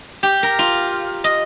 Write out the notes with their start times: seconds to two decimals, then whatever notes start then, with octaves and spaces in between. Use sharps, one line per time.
0.23 G4
0.43 A#4
0.59 F4
1.24 D#5